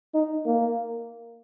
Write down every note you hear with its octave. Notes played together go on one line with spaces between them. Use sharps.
D#4
A#3